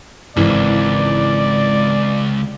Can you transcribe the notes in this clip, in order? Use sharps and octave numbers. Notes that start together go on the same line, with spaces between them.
G#1 C#2 E3 D5